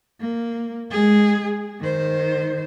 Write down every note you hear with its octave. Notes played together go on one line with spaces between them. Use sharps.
A#3
G#3 G#4
D#3 C5